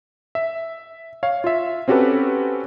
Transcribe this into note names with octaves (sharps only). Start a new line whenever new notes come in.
E5
C#5 F5
F4 E5
C4 C#4 F#4 G4 A4 B4